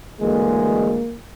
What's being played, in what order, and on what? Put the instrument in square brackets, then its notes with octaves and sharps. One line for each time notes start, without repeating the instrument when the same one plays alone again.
[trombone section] D2 E3 G#3 [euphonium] A#3